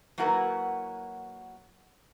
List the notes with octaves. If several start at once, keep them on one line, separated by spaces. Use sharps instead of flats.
F#3 A#3 E4 F#4 A#4 B4